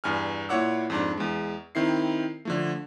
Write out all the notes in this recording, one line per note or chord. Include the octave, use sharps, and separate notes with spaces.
E2 G2 G#5 F6
A#2 E4 C#5 F#5 D6 E6
F2 G#2 D4
E2 G#3
D#3 C4 E4 C7
D3 F3 A3